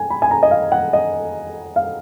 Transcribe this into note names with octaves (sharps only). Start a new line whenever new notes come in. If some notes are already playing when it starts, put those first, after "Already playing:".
Already playing: G#5
B5
G#5
A#5
D#5
F5
F#5
D#5
F5